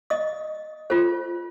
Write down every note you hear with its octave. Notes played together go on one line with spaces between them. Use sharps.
D#5 D#6
F4 A4 C5